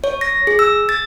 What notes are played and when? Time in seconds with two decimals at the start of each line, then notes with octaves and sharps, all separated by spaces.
0.04 C#5
0.21 A#6
0.47 G#4
0.59 E6
0.89 A6